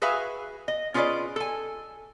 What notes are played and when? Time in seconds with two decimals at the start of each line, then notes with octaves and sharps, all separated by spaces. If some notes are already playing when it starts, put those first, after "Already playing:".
0.02 F#4 G#4 B4 E5 F5 G#5
0.68 D#5
0.94 C#4 F4 G#4 B4 D5 D#5
1.36 A4 G#5